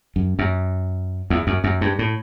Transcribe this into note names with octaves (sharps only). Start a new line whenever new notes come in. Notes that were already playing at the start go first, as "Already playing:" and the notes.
F#2
F#2
E2
F#2
F#2
G2
A2